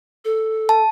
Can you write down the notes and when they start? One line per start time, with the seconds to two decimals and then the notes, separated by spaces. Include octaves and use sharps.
0.25 A4
0.69 A5